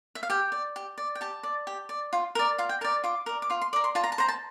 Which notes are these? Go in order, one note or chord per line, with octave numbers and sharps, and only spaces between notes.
E5
F5
G4 G5
D5
G4
D5
G5
G4 A5
D5
G4
D5
F4
A#4 D5
F4 F5
G5
A#4 D5 A5
F4 D6
A#4 D5
D6
F4 C6
C6
A#4 D5 D6
C6
F4 A5
A#5
A5
C5 A#5
A5